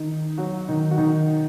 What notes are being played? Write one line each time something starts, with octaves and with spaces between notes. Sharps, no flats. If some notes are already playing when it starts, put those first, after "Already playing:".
Already playing: D#3 D#4
F#3 F#4
D#3 D#4
F#4
D#3 D#4